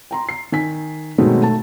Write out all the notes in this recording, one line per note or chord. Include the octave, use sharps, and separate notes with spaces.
G5 A#5 C6
C7
D#3 G#5 B6
B2 D#3 F#3 G#3 A3 C4
A3 A5